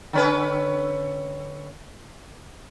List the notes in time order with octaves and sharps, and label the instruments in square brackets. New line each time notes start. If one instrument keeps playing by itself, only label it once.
[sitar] D3 C#4 B4